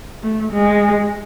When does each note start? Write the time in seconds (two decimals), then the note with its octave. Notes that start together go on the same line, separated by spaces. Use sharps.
0.23 A3
0.52 G#3